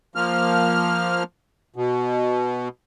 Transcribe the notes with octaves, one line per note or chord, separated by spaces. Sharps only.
F3 A#3 F6
B2